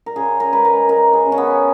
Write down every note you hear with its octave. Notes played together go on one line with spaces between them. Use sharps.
A#4
C#3 G#4
A#4
G#3 B4
A#4
G#3 A#4
G#4
C#3
C#4
B3